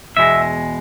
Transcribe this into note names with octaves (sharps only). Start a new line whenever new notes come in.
E2 B2 G#3 E5